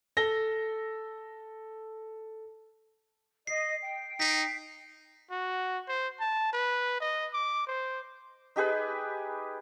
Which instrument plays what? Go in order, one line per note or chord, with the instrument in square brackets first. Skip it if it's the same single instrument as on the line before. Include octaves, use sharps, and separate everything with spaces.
[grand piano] A4 A#6 G7
[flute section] D#5 [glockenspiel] C7
[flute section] G5
[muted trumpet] D#4 [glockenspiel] B6 C7
[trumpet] F#4
C5
A5
B4
D#5
D6
C5
[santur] D#4 G4 G#4 B4